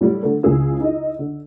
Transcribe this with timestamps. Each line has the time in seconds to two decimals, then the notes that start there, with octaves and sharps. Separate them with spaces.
0.01 A2 F#3 G3 E4
0.23 D3 A3
0.43 C#2 C#3 E4 G#4 E6
0.80 D#4 E4 D#5
1.19 D3